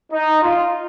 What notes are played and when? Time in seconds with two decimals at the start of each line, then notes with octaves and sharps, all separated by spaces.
0.12 D#4
0.42 F4